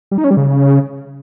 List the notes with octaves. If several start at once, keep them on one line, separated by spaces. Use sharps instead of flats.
G3
D#4
C#4
G3
C#3